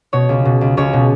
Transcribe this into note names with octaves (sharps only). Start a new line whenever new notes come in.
B2 C#5
C#2
B2
C#2
C#2 C#5
B2